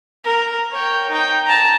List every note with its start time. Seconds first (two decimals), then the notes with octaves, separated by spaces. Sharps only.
0.25 A#4
0.72 C#5 G5
1.10 D#4 G5
1.47 A5 A#5